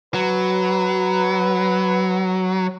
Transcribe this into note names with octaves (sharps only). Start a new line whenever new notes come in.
F#3 B4